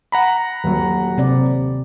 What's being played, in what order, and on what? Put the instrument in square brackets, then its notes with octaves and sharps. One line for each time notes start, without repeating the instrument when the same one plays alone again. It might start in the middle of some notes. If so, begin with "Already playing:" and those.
[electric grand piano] F#5 A#5 B5
[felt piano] D#1 F#3
[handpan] C3 C4 D5